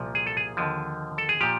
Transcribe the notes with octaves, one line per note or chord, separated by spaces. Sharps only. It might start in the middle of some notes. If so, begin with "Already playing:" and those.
Already playing: C2 A#2 F3
G#4
A4
G#4
D#2 D3 F3
A4
G#4
A#2 F3 G4